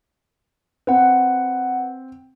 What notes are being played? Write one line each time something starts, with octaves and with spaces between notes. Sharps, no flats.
C4 B4 F#5